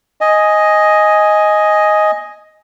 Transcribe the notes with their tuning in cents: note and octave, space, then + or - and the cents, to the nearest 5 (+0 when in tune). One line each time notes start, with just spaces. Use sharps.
D#5 +5 G#5 +0